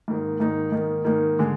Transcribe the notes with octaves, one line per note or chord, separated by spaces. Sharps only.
G#2 D#3 A#3 D#4
G#2 D#3 A#3 D#4
G#2 D#3 A#3 D#4
G#2 D#3 A#3 D#4
D3 G#3